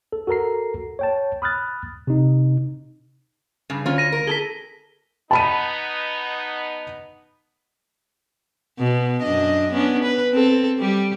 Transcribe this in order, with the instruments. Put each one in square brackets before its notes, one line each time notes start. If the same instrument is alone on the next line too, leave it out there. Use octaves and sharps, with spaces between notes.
[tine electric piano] A4
F#4 A4 A#4 A#5 C7
C#5 G5 A5
B5 D#6 F6 F#6 A6
C3 D#4
[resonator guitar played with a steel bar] G2 C#3
[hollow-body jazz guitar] D2 [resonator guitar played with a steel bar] C#4 F4
[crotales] A#6 D#7
[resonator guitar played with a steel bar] A#4
[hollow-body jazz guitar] G#4 A4 [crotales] B6 G7
[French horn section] B3 D#4 [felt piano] A5 B5 D#7
[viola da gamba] B2 B3
F#2 D4 D#5
B3 C#4 D4
B4
C4 A4
G3 G4